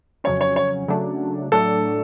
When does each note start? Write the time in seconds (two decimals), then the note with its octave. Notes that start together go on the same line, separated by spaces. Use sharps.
0.24 F2 C#3 F#3 C#4 C#5
0.41 C#5
0.56 C#5
0.88 C#3 F#3 A3 D4
1.52 A2 F#3 A3 D4 A4